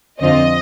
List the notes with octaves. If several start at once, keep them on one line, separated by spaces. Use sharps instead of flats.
F2 D3 F3 C4 F4 D#5